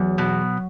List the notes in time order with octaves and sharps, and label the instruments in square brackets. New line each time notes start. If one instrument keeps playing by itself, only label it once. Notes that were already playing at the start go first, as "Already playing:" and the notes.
Already playing: [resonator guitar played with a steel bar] E2 [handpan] F#3
[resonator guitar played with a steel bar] B2